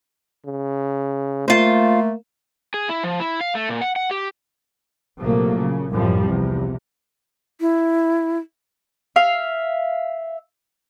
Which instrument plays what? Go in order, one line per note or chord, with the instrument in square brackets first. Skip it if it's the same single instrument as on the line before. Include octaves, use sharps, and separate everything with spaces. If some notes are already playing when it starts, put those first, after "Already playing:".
[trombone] C#3
[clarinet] A3 [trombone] A#3 [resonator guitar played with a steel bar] F4 C5
[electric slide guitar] G#4
E4
F3
E4
F5
A3
A#2
F#5
F#5
G4
[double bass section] A#1 C3 F3 F#3 A3 A#3
C#3
C2 F#2 A2 F3 G3
E2 C3
[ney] E4
[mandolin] E5 F5